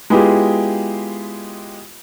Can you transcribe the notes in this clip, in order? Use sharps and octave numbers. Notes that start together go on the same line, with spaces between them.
G#3 B3 E4 F4 G4 G#4